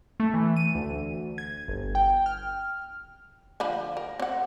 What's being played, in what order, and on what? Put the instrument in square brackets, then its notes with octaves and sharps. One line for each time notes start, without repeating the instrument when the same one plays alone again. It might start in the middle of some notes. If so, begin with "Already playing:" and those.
[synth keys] A3
E3
D#7
D2
G#6
G1
G5
F6
[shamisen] D3 F3 B5
A#4
C4 F#5